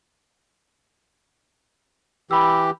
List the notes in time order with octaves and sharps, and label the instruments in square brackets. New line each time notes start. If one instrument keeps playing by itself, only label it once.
[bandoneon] E3 G4 [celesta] B5 E6